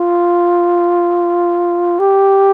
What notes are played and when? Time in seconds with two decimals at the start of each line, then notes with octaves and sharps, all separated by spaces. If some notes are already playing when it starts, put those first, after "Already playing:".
Already playing: F4
1.99 G4